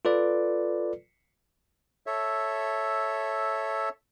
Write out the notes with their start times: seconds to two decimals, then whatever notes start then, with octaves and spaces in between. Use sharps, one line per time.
0.05 F4 A4 B4 D5
2.06 A4 C#5 E5